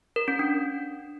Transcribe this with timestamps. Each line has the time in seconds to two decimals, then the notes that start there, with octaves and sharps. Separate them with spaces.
0.16 A#4
0.28 C#4
0.39 D4